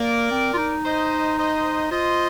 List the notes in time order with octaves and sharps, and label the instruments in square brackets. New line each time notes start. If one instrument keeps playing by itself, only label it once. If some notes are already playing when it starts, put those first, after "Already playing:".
Already playing: [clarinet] A#3 [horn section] A#4 D5
[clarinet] C4
F4
D#4
[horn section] C5 D#5
C5 D#5
[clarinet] F4 [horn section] C5 D#5